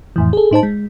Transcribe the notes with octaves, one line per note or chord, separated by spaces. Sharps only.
F2 A2 E3
G#4 A4
A2 D#4 C5 A5
G#3